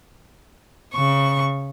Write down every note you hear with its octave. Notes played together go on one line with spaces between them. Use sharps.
C#3 C#6